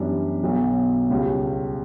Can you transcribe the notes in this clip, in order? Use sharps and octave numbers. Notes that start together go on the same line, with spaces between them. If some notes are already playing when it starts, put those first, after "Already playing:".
Already playing: F#2 E3 G3 B3 D4
B1 B2 F#3
C#2 C#3 G3 C#4